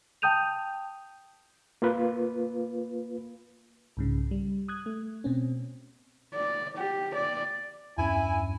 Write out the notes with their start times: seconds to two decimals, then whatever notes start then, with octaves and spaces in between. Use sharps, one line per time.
0.22 G5 A5 D#6 G6 D#7 F7
1.82 A#3 F4 B4
3.97 C2 G#2 C#3
4.31 G3
4.68 D#6 F#6 G#6
4.86 A3
5.24 B2 C4 C#4
6.34 D5
6.77 G4
7.14 D5
7.98 E2 G2 C#4 E4 G#5